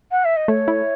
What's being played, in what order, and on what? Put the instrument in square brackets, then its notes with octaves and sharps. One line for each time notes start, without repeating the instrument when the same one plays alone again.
[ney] F#5
E5
D#5
[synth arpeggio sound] A3 [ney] C#5
[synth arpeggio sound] E4